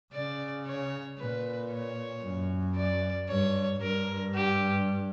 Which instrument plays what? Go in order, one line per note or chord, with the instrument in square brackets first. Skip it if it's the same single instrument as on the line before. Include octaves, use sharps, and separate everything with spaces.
[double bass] C#3 [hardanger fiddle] D5
[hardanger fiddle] C#5
[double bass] A#2 [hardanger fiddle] B4
[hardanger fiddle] C#5
[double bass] F#2
[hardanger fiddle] D5
[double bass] G2 [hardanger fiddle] C#5
[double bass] G2 [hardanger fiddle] A#4
[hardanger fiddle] G4